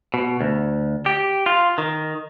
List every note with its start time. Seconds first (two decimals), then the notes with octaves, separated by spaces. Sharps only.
0.14 B2
0.41 D2
1.06 G4
1.46 F4
1.78 D#3